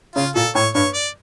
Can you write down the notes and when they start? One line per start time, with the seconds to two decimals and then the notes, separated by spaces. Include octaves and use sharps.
0.16 C#3 F4
0.35 A#2 A4
0.55 A2 C#5
0.75 G2 C#5
0.94 D5